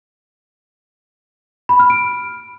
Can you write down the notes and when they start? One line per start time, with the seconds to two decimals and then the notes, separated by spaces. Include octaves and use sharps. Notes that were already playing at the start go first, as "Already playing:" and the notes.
1.69 B5
1.80 F6
1.90 D7